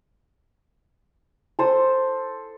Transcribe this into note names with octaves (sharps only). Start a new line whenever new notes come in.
A4 C5 D#6